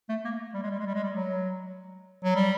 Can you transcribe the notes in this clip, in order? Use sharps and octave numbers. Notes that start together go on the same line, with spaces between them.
A3
A#3
G3
G#3
G3
G#3
G3
G#3
G3
F#3
F#3
G3